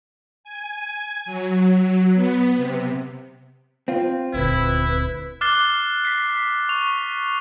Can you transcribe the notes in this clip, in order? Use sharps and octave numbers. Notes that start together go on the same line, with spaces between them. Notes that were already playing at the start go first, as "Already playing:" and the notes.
G#5
F#3
B3
C3
C4 F4
D#1 D2 E4 B4
D6 F6 F#6 A6 C7 G7
B6 C7
C#6 F7